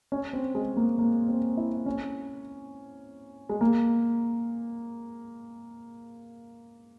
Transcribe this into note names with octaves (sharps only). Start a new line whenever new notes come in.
C#4
C4
G#3
A#3
A#3
C4
E4
C#4
G#3
A#3